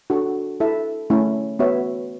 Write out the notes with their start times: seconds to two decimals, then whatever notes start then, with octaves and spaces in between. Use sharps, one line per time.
0.10 D4 F#4 A4
0.60 E4 A4 E5
1.10 A3 C#4 E4
1.59 B3 F#4 C#5 E5